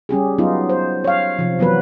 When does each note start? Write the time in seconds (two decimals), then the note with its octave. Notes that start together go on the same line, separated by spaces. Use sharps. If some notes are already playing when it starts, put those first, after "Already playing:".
0.09 G3 C#4 G4 G#4
0.38 F#3 B3 D#4 F4
0.69 C5
1.04 C#5 F5
1.39 C3 F3
1.59 E3 F#3 B3 B4